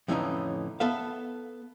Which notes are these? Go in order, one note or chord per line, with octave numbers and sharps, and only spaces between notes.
F2 A2 D3 E3 C#4 D#4
B3 A4 E5 F5